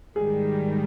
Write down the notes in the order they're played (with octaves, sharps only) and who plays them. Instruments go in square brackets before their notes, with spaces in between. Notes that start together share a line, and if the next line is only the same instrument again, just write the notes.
[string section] G#2 D#3 G3 [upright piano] G#4